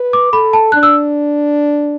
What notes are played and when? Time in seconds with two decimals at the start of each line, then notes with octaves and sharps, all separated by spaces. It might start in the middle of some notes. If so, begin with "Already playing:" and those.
Already playing: B4
0.13 D6
0.33 A4 B5
0.53 A5
0.72 D4 F#6
0.83 E6